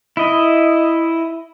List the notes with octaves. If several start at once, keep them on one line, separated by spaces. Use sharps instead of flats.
E4 D#5